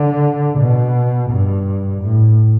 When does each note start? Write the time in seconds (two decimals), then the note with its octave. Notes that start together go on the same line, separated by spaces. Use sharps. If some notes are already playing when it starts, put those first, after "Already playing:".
Already playing: D3
0.59 B2
1.30 G2
2.02 A2